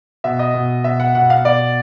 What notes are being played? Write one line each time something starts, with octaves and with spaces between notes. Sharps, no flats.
B2 E5
D#5
B2
B2 E5
F#5
B2 F#5
F5
B2 D5